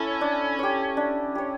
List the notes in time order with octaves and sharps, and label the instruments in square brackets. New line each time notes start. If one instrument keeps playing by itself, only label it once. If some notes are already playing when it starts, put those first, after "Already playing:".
Already playing: [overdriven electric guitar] C#4 [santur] E4 A4
[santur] D4
G4 C#5
D4
G4 C#5